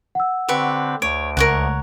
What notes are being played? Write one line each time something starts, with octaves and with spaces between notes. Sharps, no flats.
F#5 E6
D3 C4 G4 B4 C#6
D2 C#5 D7
C#2 A#4 C#5 F#5